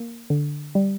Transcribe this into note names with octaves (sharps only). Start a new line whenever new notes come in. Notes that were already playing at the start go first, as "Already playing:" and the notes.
Already playing: A#3
D3
G3